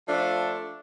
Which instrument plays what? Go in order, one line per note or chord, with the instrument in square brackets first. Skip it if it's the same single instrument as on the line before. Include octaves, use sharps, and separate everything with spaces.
[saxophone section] F3 A3 D4 F4